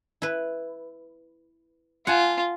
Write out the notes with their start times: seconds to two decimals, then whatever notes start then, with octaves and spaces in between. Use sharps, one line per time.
0.22 E4 B4
2.07 F4 F#5 G#5 A5